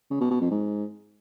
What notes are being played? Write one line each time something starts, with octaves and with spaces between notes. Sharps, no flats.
C#3
B2
B2
F2
G#2